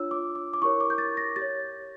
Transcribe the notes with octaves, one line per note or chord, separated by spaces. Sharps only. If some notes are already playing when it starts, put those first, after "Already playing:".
Already playing: D4 F4 C#5 E6
D6
D6
D6
E4 G4 A#4 C#5 C#6
D6
G6
A6
A#6
G4 A6
C#5